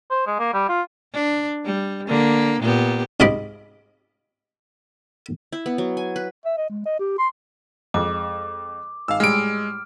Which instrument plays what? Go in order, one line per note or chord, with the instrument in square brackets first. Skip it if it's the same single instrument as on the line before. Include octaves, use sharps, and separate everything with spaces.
[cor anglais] C5
G#3
A#3
G3
F4
[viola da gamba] D4
G3
D3 A#3
A#2 B3 G4
[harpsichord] G#2 C3 F4 D#5 B5 D6
[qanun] E4
B3
F#3
G#5
B4
[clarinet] E5
D#5
G#3
D#5
G4
C6
[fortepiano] F2 G#3 [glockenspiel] D6
[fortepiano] G#1 [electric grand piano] F5 E6
[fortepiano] A2 G3 [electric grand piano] G#3 D7 [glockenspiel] F6